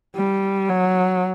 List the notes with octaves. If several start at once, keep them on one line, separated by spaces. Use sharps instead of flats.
G3
F#3